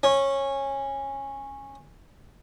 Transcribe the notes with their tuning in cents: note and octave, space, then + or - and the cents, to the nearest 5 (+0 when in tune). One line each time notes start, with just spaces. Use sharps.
C#4 -15